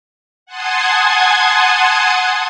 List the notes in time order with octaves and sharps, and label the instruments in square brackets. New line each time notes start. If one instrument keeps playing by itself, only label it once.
[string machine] F#5 G#5 A5 C6 D#6 G#6